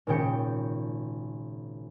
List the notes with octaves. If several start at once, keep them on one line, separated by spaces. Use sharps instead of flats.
G#1 A#2 C#3 G5 C#7